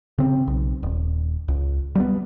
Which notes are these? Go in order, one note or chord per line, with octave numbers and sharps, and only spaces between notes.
C#3 C4
B1
D#1
C#2
G3 A#3 B3